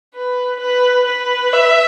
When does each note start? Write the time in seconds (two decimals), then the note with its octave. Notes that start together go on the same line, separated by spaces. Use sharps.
0.15 B4
0.60 B4
1.06 B4
1.53 E5